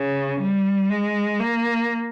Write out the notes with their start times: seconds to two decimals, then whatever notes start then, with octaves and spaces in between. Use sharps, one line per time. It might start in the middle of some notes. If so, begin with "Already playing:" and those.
Already playing: C#3
0.41 G3
0.90 G#3
1.40 A#3